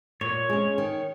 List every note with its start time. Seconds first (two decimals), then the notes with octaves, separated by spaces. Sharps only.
0.21 A#2 C#5
0.49 G#3 C#4
0.78 D#3